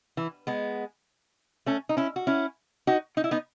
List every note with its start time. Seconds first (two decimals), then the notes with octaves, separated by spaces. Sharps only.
0.17 E3
0.47 G#3 B3
1.66 A3 C#4
1.89 D#4
1.97 C#4 E4
2.16 F#4
2.27 C#4 E4
2.87 D#4 F#4
3.17 D#4
3.24 E4
3.31 B3 D#4